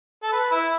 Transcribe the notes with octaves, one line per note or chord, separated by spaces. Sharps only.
A4
B4
E4